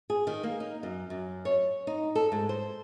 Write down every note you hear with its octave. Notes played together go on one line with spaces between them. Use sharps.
G#4
D#3
A#3
D#4
F#2
F#2
C#5
D#4
A4
G#2
C5